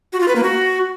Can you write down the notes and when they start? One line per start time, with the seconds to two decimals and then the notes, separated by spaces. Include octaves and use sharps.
0.13 F#4
0.20 F4
0.28 B4
0.36 A#3
0.43 F#4